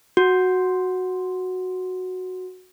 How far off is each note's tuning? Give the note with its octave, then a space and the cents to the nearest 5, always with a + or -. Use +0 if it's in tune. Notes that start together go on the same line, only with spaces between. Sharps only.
F#4 -5